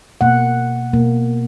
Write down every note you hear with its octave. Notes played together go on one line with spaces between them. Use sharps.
B2 A#3 F#5
B2 A#3